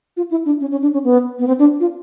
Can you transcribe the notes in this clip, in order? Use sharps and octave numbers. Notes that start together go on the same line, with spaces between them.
F4
E4
D4
C#4
C#4
D4
C#4
B3
B3
C4
D4
F4